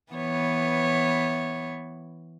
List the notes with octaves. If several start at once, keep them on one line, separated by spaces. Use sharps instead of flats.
E3 B3 C#5